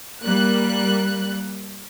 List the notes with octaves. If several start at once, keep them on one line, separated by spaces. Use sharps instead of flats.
G3 A#3 F#6